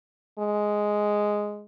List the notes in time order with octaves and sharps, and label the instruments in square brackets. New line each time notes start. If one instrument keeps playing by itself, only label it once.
[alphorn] G#3